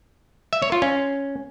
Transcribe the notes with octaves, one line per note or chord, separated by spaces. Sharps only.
E5
C#5
F4
C#4